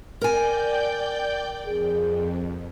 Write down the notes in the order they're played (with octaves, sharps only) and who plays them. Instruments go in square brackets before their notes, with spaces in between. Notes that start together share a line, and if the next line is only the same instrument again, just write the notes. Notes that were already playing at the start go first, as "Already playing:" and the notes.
[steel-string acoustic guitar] A#4 G#5 [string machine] D5 G5 G6
[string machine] F2 [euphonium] G#4